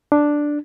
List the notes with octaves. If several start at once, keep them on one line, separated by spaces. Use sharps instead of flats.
D4